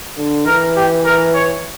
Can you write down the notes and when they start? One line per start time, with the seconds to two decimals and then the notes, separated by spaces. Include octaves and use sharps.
0.17 D3
0.46 E3 A#4
0.76 G4
1.05 A#4
1.34 C#5